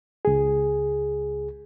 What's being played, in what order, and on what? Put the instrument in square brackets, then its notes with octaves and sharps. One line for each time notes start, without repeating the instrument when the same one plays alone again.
[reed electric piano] C#2 G#4